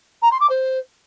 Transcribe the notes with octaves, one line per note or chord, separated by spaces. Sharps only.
A#5
C6
D6
C5